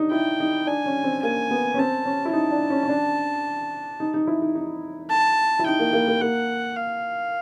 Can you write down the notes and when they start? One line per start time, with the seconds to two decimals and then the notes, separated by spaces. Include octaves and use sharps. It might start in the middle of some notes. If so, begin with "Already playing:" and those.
Already playing: D4 D#4
0.11 E4 G5
0.40 D#4
0.67 D4 G#5
0.86 C#4
1.04 C4
1.22 A#3 G#5
1.51 B3
1.74 C#4
1.78 C4 A5
2.05 C#4
2.25 E4
2.33 D#4 A5
2.51 D4
2.70 C#4
2.83 C#4
2.89 D4
4.00 D#4
4.14 D#4
4.27 E4
4.42 D#4
4.55 D#4
5.10 A5
5.59 E4
5.66 D#4 G5
5.79 A#3
5.93 A#3
6.08 A#3
6.22 A#3 F#5
6.76 F5